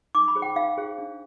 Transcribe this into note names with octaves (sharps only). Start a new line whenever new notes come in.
D#4 D6
B5
G#4 C5
G5
D#4 F5
G#4 C5
D4